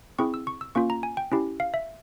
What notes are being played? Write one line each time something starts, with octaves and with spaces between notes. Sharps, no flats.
C4 E4 G#4 C#6
E6
C#6
E6
A#3 C#4 F4 C#6
A#5
G#5
G5
C#4 E4 G4
F5
E5